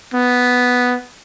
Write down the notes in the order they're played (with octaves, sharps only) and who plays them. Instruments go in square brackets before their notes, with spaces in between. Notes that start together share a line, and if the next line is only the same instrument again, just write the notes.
[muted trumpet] B3